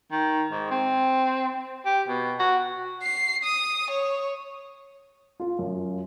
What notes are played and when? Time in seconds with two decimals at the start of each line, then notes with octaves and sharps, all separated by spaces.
0.11 D#3
0.51 G#2
0.71 C4
1.85 G4
2.08 B2
2.39 F#4
3.03 C7
3.43 D#6
3.91 C#5
5.40 F4
5.59 F#2